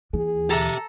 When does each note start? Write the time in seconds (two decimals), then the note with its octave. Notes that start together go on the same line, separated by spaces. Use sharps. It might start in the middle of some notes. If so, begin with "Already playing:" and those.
0.13 D#2 E3 G#4
0.50 G4 A4 E5 A5 A#5